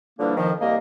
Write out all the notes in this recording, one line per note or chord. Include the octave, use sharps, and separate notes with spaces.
D3 E3 F3 G3 A#3 D4
F2 D#3 F3
C2 A#3 D#5